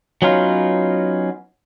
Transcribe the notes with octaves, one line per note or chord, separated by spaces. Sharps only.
F#3 B3 C#4 D#4 F4